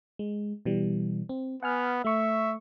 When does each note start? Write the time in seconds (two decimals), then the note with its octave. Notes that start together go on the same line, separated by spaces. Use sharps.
0.19 G#3
0.65 B2 E3 G3
1.29 C4
1.63 B3 F#5 G#5 F6
2.05 A3 E5 C#6